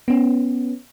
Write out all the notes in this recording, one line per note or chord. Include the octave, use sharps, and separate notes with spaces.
B3 C#4